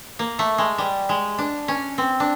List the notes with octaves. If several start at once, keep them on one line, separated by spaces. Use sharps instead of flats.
A#3
A3
G#3
G3
G#3
D4
C#4
C4
D4